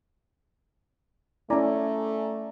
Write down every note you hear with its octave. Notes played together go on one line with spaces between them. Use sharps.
A3 C#4 E4 D5 G#5 A#5